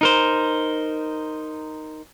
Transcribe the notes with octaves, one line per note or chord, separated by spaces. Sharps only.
D#4 A#4 C5